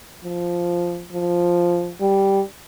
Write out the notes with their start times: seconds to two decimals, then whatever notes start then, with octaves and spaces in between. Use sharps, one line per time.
0.24 F3
1.13 F3
2.01 G3